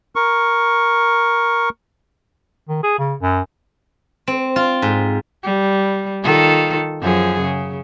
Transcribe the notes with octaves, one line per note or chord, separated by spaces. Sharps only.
A#4 C#6
D#3
G#4
C#3
F#2
C4
F4
G#2
G3
D#3 F4 A4
F#2 F3 G#4
C#3